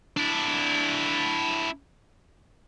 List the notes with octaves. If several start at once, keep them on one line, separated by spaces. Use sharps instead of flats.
D4 E4